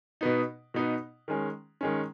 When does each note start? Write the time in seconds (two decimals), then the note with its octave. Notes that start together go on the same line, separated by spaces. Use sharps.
0.21 B2 B3 D#4
0.74 B2 B3 D#4
1.28 D#3 G#3 C#4
1.81 D#3 G#3 C#4